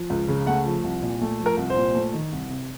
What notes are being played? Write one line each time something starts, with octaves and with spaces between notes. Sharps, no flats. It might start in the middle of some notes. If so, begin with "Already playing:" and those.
Already playing: F3
C#2
C#3
A3 F#5
F3
C2
A#2
A3
F3
A#4
C2
C5
A#2
A3
D#3
C2
C3